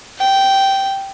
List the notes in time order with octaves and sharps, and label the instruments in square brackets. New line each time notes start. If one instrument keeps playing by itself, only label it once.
[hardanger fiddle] G5